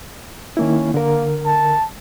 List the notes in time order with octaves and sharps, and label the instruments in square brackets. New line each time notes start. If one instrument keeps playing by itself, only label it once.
[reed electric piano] D#3 A#3 E4 [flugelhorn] C#4
[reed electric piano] D3 A#4 [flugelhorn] A#3
[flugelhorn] A5